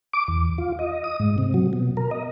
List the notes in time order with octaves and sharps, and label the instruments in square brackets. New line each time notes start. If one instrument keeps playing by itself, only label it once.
[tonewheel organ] D6
E2
F4
D#5
D#6
G#2
C3
F#3
B2
A#4
D#5